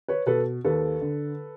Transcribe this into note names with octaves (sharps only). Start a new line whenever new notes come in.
B4 C#5
B2 A4 B4
D#2 A4 B4
D3